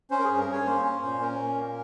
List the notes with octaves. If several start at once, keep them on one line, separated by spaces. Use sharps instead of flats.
C#4 C5
A#4
G2 G#4
A#4
C#4 C#5
A#3 C5
C#4
A#2
C#4 A#4
A#2
A#3